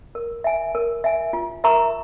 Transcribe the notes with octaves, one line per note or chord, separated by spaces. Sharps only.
A#4
E5 G#5
A#4
E5 G#5
F4
A#4 E5 A#5 C#6